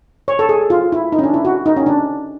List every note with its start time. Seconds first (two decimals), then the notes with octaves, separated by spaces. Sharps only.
0.28 C#5
0.39 A4
0.49 G#4
0.70 F4
0.92 E4
1.12 D#4
1.19 C#4
1.24 D4
1.34 E4
1.45 F#4
1.66 D#4
1.77 C#4
1.86 D4